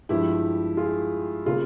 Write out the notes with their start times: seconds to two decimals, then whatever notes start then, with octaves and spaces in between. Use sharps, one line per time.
0.09 G2 F3 G#3 E4 G4
0.77 F4 G#4
1.45 C#3 G3 A#3 F4 G#4